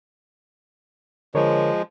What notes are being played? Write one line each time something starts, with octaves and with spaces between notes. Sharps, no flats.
D3 F3 G#3 A#4 C#5